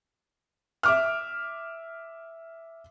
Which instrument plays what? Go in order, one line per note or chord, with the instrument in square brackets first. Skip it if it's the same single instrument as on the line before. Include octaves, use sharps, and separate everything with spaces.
[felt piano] E5 D6 F6